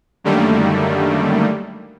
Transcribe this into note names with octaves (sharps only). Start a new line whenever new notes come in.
F#2 D3 D#3 G3 A3 A#3